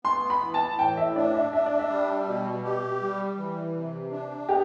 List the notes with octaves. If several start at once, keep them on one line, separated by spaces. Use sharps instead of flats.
B3 C6
B5
E3
A5
A2 G5
E5
D4 D5
E5
D4 E5
D5
E5
G3
B2
G4
G3
E3
C3
D4
B3 G4